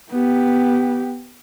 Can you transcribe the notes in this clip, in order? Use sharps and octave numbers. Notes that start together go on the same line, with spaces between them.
B3 G4